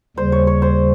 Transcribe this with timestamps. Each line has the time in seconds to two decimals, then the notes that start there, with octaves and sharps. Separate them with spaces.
0.17 D#2 C#3 G3 C5
0.32 C#5
0.47 C#5
0.62 C5